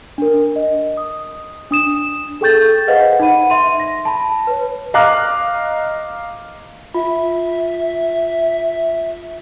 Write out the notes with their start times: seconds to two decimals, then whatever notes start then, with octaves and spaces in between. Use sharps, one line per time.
0.18 D4 A#4
0.56 D#5
0.97 D#6
1.71 D4 D#6 E7
2.41 G#4 A4 G5 C#6 G6 A6
2.88 G#4 B4 C5 D#5 F5 F#5
3.19 D#4 F#5 B5 D#7
3.50 E5 C6 D#7
3.80 A#6
4.05 A5 B5
4.47 B4 C#5
4.94 D#5 F5 A#5 D6 F#6
6.94 F4 E5